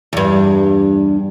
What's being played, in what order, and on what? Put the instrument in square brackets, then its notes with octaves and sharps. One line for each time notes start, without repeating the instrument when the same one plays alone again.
[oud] E2 G2